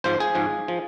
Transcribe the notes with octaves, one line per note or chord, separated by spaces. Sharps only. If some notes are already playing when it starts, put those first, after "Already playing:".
G#1 G#2 F3 C5
G#4
G#1 G#2 F3
F3